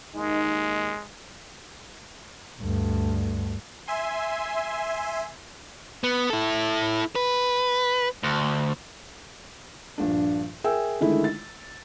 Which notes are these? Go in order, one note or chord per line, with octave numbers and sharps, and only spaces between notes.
D#2 G#3 A#3 D#4
D2 G2
E5 G#5 C6
B3
E4 A4
B4
D2
A#1 G2 D4
G#4 A#4 E5 G5 G#5 E6
D3 D#3 G#3 A3 E4
A6